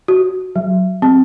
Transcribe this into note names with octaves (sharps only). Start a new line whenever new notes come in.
F#4
F#3
C4